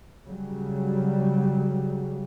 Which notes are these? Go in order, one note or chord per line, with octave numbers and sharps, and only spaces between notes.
C#3 F#3 G3